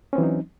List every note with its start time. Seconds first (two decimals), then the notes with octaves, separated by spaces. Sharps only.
0.13 C#4
0.15 C4
0.18 E3
0.21 F#3
0.23 D#4